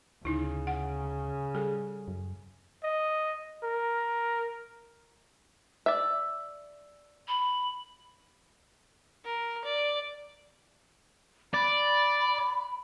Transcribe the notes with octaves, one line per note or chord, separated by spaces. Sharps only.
D2 C#3 D#4 E4
F#5
G3 G#4 A4
F#2
D#5
A#4
D5 E5
B5
A#4
D5
D5 B5